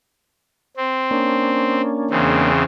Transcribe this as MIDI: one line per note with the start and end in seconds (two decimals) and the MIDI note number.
0.77 1.81 60
1.11 2.52 58
1.11 2.52 61
1.11 2.52 62
2.10 2.63 40
2.10 2.63 49
2.10 2.63 60